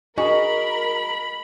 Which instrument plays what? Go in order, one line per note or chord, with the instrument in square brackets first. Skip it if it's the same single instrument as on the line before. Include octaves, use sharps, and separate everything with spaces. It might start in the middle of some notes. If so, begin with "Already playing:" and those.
[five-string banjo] F#4 G#4 G#5 [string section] A#4 [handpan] D#5 [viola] B5